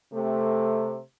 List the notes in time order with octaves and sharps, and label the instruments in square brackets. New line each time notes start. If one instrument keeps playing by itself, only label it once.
[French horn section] C3 A3